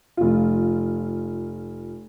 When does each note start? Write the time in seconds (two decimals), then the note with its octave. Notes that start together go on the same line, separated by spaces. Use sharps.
0.17 F1 F4